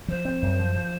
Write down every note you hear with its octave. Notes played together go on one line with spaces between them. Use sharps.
F3 C5
C4
F#2
F3
F3